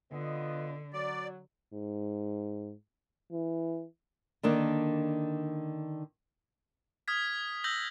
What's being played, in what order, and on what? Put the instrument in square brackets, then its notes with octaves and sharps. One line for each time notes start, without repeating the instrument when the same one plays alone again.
[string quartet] D3 [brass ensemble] B3 F4 D#5
[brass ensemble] F#3 [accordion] D5
[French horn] G#2
E3
[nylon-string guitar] D3 D#3 A#3 D4
[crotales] D#6 F6 G#6 B6
E6 G6 A#6 F#7